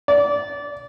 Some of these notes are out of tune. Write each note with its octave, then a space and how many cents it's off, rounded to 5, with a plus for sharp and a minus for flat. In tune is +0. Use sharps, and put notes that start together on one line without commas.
D5 -20